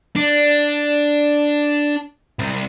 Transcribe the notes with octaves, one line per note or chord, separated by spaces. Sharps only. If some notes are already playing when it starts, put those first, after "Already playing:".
D4
C2